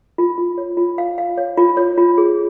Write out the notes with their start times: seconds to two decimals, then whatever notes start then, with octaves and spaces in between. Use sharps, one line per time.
0.18 F4
0.38 F4
0.58 C#5
0.77 F4
0.98 F5
1.18 F5
1.38 C#5
1.57 F4
1.77 C#5
1.98 F4
2.18 G#4